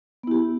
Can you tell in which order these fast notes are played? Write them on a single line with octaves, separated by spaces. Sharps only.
B3 E4 G4